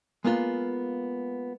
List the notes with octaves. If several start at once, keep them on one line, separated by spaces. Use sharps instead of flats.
G#3 A#3 B3 F4